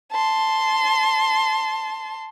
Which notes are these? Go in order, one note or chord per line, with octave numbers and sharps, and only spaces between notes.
A5 C6